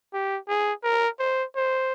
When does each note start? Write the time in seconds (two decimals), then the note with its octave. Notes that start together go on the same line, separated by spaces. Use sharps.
0.13 G4
0.48 G#4
0.84 A#4
1.19 C5
1.56 C5